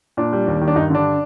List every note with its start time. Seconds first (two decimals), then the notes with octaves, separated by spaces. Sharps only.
0.17 A#2 D4
0.33 G3
0.47 D#2
0.61 D#3
0.68 D4
0.76 G2 D#4
0.90 D3 D4